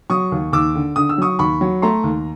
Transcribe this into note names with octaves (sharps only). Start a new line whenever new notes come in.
F#3 C#6 D#6
D#2
D#2 D6 E6
D3
D3 D#6
E6
F#3 C#6 D#6
D#2 B5 C#6
F#3
A3 A#5 C6
D#2